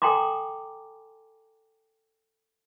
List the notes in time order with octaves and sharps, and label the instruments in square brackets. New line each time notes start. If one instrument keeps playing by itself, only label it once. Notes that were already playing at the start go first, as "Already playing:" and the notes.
[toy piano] A4 G5 G#5 A#5 C6 D6